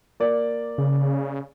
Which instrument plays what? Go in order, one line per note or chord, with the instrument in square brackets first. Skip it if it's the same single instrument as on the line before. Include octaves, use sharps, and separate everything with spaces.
[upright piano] A#3 D5
[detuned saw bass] C#3